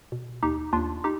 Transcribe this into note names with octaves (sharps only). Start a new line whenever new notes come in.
B2
D#2 D#4 G4
D#2 D4 F4
D#4 G4